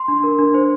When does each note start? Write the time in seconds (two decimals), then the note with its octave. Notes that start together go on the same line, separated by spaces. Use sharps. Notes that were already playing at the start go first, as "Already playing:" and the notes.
Already playing: C6
0.08 D4
0.23 A#4
0.39 D4
0.54 C5